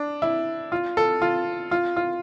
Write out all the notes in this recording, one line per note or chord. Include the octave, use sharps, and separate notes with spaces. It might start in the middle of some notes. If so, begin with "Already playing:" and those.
Already playing: D4
E4
F4
A4
F4
F4
F4